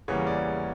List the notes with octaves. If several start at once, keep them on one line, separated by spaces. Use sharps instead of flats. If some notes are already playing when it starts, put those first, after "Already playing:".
E2 C#3 E3 G3 A#3 C#5
D5